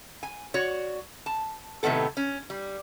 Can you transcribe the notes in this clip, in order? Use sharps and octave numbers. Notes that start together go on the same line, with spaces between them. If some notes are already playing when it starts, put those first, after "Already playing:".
G#5
F#4 C#5 D5
A5
A2 C3 D#3 B3 A4
C#4
G3